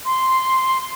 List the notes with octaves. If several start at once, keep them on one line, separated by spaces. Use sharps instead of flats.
C6